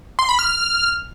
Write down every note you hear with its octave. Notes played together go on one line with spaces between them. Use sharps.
C6
B5
F6